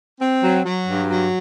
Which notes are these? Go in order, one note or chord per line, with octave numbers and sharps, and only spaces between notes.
C4
F#3
F#3
G2
F#3